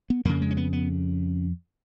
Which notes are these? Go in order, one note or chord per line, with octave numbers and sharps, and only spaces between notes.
B3
F2 C#3 A#3
G#3
C#4
B3
B3